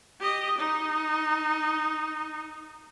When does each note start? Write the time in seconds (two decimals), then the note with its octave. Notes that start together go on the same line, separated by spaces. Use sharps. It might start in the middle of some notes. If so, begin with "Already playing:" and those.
0.19 G4 D#5
0.58 D#4